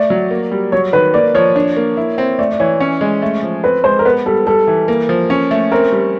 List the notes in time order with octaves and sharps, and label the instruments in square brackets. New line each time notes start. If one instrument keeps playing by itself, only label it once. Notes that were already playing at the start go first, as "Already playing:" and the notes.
Already playing: [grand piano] A3 [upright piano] D5
[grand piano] F#3
A#3
G3
[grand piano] F#3 [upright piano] C#5
[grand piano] D#3 [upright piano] B4
[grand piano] A#3 [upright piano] D5
[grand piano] F3 [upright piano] C#5
[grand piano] D4
A#3
E4
C4
[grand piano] A3 [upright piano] D5
[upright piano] D5
[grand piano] E3 [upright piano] C#5
[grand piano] C#4
G#3
A3
F3
[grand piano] C4 [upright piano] B4
[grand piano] G#3 [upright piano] C5
[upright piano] A#4
[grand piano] B3 [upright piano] B4
[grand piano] G3 [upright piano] A4
[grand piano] G3 [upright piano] A4
[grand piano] E3
A#3
F3
C#4
A3
[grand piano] C4 [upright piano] A#4
[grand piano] G3